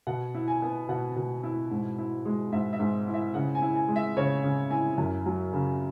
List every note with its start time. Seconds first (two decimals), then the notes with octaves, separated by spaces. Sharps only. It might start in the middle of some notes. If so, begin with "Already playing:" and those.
0.07 B2 F#5
0.35 E4
0.48 G#5
0.62 B3
0.89 B2 F#5
1.16 B2
1.44 E4
1.71 G#2
1.98 E4
2.26 G#3
2.53 G#2 E5
2.73 E5
2.80 G#2
3.07 E4
3.14 E5
3.34 C#3 F#5
3.55 G#5
3.62 E4
3.75 G#5
3.88 G#3
3.96 E5
4.17 C#3 C#5
4.43 C#3
4.70 E4 G#5
4.98 F#2
5.26 F#3
5.53 C#3